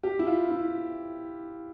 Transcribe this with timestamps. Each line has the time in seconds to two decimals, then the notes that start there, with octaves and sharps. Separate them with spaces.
0.03 G4
0.19 E4
0.27 F4
0.50 E4